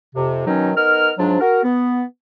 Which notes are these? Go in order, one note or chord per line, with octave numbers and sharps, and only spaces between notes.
F2 C3
B2 D#3 F#3 C#4 D#4
B3 D#4 A#4 F6
G#2 F3 F#3 D4
F#4 A#4
B3